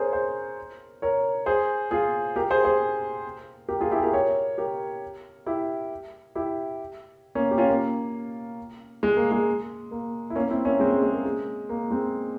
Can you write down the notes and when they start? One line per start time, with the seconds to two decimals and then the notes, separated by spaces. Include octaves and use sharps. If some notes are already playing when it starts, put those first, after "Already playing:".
Already playing: G#4 A#4 C5 C#5
0.13 G#4 C5
1.02 A#4 C#5
1.46 G#4 C5
1.91 F4 G#4
2.36 G4 A#4
2.51 G#4 C5
2.65 G#4 C5
3.69 G4 A#4
3.81 F4 G#4
3.91 E4 G4
3.97 G#4
4.02 G4 A#4
4.13 A#4 C#5
4.58 G4 A#4
5.46 E4 G4
6.35 E4 G4
7.35 A#3 C#4
7.51 G4
7.58 C#4 F4
7.69 A#3
9.03 G#3
9.16 A#3
9.31 G#3
9.91 A#3
10.30 E4
10.35 A#3 C#4
10.50 C4 E4
10.65 A#3 C#4
10.80 G#3 C4
10.91 G#3
11.02 G#3
11.13 A#3
11.25 G#3
11.69 A#3
11.91 G#3 C4